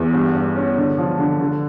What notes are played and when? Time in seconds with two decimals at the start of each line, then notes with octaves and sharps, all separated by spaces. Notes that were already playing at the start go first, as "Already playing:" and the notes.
Already playing: E2
0.13 G2
0.35 G2
0.56 C#4
0.77 D3
0.98 F3
1.19 D3
1.40 D3